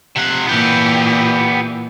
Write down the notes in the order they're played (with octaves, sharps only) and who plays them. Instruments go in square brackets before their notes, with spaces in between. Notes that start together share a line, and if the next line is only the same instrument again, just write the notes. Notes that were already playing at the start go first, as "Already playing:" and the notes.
[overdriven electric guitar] C3 F#5
[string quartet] A#2 E3 [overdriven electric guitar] B3 G4